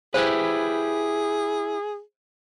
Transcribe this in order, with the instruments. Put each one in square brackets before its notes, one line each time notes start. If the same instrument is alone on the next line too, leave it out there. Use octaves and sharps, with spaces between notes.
[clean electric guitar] E4 G4 B4 [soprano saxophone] G#4 [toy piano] C5